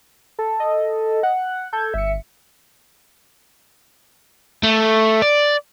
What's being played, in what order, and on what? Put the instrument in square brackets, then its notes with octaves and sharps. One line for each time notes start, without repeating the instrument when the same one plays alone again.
[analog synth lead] A4
[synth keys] D#5
[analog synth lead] F#5
[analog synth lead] A4 [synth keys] G6 G#6
[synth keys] G1 C#7 [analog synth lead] E5
[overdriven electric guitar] A3
D5